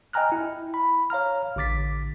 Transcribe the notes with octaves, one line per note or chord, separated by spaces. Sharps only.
D#5 G5 G#5 A#5 F6 F#6
E4
B5
C#5 F5 A#5 F6
A1 D3 D6 A6 B6